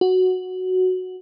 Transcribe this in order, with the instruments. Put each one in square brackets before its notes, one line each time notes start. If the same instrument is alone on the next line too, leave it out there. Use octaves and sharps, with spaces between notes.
[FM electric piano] F#4